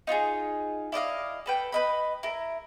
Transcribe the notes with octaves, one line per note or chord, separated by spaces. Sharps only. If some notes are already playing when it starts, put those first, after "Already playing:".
D#4 F4 F#4 G#4
E4 D5 D#5 F5
A4 B4 G5
B4 D#5 B5
E4 A#4